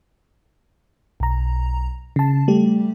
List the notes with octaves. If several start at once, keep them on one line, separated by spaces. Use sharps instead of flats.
B1 A#5
C#3 A5
G3 A3 G4